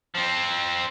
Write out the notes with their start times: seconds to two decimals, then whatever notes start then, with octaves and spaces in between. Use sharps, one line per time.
0.15 F3 C4